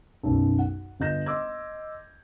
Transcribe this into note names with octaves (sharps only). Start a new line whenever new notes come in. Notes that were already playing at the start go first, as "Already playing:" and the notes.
B1 F#2
F#5
G1 F4 D#5 G6 A#6 E7
D#5 C6 D6 E6 G#6